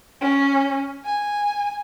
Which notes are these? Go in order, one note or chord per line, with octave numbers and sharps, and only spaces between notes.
C#4
G#5